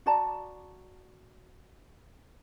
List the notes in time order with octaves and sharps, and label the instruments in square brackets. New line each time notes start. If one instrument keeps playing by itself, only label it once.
[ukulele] F#4 D5 A5 A#5